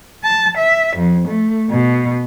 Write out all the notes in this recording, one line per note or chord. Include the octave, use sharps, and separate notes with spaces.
A5
E5
F2
A3
B2